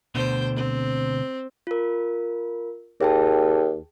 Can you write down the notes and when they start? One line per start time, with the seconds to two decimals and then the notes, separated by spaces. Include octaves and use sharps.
0.15 D2 B2 D3 C5 G5
0.56 C4
1.67 F4 A#4
3.01 D#2 G#4 G5 A5